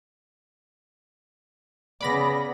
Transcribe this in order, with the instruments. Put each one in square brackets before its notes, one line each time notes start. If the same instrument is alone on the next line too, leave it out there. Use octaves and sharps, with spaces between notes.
[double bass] C#3 B3 [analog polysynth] D5 B5 A#6